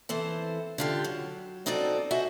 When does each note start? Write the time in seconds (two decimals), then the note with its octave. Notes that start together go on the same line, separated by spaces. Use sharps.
0.09 E3 C4 A4 C5
0.78 D3 F4 G4
1.04 F#3
1.66 C4 D#4 F#4 A4 D5
2.11 F#4 C5 D#5 E5 G#5